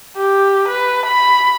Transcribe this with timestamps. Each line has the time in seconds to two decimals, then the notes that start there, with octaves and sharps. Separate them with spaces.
0.17 G4
0.68 B4
1.06 B5